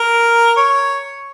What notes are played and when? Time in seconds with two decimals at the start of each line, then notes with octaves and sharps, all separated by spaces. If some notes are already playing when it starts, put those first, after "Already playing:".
Already playing: A#4
0.57 C#5